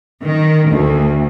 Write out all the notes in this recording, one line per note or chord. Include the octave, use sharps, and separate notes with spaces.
D#3
D2